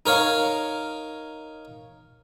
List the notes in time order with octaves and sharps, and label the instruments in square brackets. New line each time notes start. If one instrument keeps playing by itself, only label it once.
[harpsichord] D#4 A#4 C#5 F5